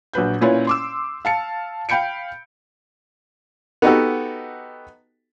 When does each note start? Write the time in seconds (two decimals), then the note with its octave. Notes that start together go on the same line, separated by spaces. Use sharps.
0.13 A#1 F#3 B4 G6
0.41 A#2 C#4 E4 F4 B4 C#5
0.67 C6 D6 E6
1.25 F5 A5 C#7
1.89 F5 G5 B5 G6 C#7 D7
3.82 B3 D#4 F#4 G4 A4